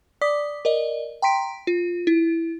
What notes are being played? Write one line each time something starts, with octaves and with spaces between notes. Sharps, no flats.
D5 D6 D#6 B6
A#4 D5 D#5
G5 A#5 C6 B6 D7
F4
E4